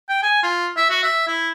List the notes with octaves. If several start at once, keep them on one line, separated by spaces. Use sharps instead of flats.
G5
G#5
F4
E5
F#4
E5
E4